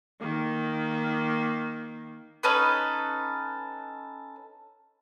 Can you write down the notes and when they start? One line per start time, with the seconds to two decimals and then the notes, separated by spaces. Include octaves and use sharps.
0.21 D#3 A#3
2.43 C#4 D#4 A4 B4